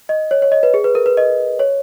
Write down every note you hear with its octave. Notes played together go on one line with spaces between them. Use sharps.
D#5
C#5
C#5
D#5
B4
G#4
B4
A#4
B4
D#5
C#5